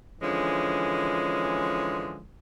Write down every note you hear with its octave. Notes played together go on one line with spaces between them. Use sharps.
D3 E3 F3 G#3 C#4